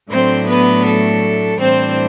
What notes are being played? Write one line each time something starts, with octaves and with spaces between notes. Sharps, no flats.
A2 F#3 A3 C4 D4 C5
B3 B4
A4
A2 E3 G3 C4 D4 C5